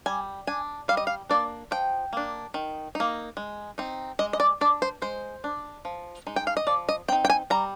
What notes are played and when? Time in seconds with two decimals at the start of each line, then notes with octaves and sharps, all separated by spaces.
0.06 G3 G#5
0.47 D4 G#5
0.88 G3 F5
0.97 D#5
1.07 F5
1.29 A#3 D4 D5
1.71 F3 G5
2.13 A#3 D4
2.54 D#3
2.95 A#3 D#4
3.37 G#3
3.78 C4 D#4
4.19 G#3 D#5
4.33 D#5
4.40 D5
4.61 D4 D5
4.82 C5
5.02 G#3 C5
5.44 D4
5.85 F3
6.27 G#3 D#4
6.36 G5
6.47 F5
6.57 D#5
6.67 F3 D5
6.89 D#5
7.08 C4 G5
7.12 D#4
7.25 G5
7.30 G#5
7.50 G3 A#5